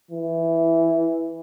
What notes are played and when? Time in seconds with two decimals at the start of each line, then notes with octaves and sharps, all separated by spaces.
0.11 E3